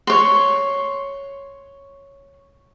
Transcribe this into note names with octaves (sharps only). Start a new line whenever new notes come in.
C#5 C6